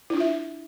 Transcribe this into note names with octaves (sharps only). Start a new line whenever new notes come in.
D4 E4 F4 E5